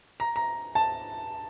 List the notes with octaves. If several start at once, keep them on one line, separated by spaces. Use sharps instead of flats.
A#5
A#5
A5